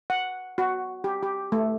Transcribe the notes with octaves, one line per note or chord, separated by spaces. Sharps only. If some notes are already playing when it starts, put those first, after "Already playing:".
F#5
F#4
G4
G4
A3